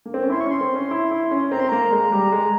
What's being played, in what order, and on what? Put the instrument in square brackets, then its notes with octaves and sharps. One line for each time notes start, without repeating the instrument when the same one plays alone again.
[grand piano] A#3
C4
C#4
[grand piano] E4 [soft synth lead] C6
[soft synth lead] C#6
[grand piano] C#4
[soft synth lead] C6
[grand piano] C4
C#4
E4
E4
C#4
[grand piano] C4 [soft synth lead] A#5
[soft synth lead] C6
[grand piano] A#3 [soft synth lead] A#5
[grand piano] G#3
G3
G#3